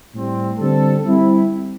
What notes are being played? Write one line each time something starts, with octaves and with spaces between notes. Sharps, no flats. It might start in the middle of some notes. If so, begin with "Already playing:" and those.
A2 G3 C4
D3 G3 C4 A4
G3 C4 E4